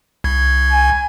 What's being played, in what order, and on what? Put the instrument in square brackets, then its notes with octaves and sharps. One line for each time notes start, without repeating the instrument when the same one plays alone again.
[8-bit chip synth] C2 G#6
[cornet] G#5